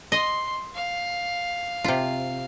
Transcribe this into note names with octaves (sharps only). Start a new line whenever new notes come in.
D#5 C6
F5
C3 F4